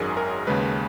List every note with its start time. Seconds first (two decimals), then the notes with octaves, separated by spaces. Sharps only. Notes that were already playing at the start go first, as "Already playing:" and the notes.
Already playing: G#1 F#2 D#3 F#3 G#4
0.17 A#4
0.47 D#2 C#3 G#3 B4